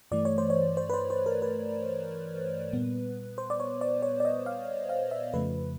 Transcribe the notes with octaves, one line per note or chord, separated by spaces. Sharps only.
G2 E3 A3 D5
C#5
C5
C#5
C5
B4
C5
C5
A#4
B4
A#2 G3 B3
C5
D5
C#5
D5
C#5
D5
D#5
F5
F5
E5
F2 C#3 F3 A3 B4